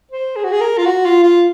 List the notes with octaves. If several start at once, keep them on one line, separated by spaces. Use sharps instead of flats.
C5
G#4
F#4
G#4
A#4
F4
F#4
F4
F4